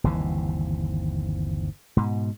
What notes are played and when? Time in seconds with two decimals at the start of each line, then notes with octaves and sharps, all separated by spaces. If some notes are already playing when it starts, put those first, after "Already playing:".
0.04 G1 D#2 C3 E3
1.97 G#2 B2